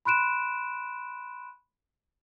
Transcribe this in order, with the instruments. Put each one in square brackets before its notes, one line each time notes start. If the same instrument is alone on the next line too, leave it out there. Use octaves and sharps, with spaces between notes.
[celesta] B5 C6 F#6 D7 E7